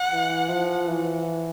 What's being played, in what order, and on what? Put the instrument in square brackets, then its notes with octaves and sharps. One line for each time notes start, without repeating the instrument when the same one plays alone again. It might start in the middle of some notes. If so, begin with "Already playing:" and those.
Already playing: [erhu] F#5
[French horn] E3
F3
E3